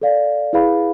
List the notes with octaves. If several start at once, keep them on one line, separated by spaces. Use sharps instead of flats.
A4 D5 F5
E4 G#4 B4 F5 B5